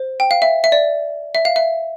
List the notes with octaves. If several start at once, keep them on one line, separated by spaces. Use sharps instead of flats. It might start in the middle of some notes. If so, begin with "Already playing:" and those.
Already playing: C5
G5
F5
E5
E5
D5
E5
F5
E5